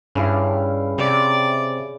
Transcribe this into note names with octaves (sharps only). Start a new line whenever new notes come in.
G2 C#3 E4 F5
C3 D5